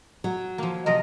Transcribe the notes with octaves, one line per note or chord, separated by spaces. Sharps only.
F#3
F3 A#3
C3 F3 A#4 D#5